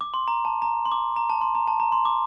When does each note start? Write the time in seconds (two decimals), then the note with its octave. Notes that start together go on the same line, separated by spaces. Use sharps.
0.01 D6
0.14 C6
0.28 A#5
0.45 A5
0.62 A#5
0.85 C6
0.92 D6
1.16 A#5
1.30 A5
1.41 C6
1.55 A#5
1.67 A5
1.80 A#5
1.92 C6
2.05 D6